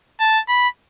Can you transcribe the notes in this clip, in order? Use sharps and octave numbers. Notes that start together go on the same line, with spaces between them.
A5
B5